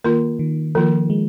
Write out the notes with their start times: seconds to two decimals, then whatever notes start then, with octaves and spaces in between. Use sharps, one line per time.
0.04 D#3 A#3 F4 A#4
0.39 D#3
0.75 D#3 F3 A#3 F4 A#4
1.10 G#3